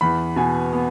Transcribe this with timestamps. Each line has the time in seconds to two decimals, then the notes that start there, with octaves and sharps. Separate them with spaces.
0.01 E2 B5
0.36 B2 G#5
0.73 B3